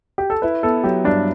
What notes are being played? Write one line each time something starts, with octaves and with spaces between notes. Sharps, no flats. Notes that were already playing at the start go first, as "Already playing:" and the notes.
G4
A4
E4 B4
B3 A4
F#3 G4
G2 D4